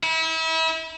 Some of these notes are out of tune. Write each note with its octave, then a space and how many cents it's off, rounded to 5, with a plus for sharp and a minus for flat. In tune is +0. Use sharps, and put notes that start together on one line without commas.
E4 -35